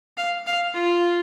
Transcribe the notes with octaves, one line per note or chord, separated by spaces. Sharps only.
F5
F5
F4